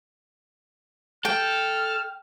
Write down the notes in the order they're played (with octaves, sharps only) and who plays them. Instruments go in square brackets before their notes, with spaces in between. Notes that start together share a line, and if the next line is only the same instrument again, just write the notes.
[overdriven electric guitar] A4 [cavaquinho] G5 [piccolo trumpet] F6